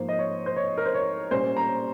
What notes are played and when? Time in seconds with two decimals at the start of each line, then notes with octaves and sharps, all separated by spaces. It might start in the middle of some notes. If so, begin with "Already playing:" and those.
Already playing: G#2 F3 A#3 C5
0.09 D#5
0.19 C#5
0.46 C5
0.56 C#5
0.78 A#4
0.86 C5
0.94 C#5
1.31 A#2 G3 C#4 C5
1.57 A#5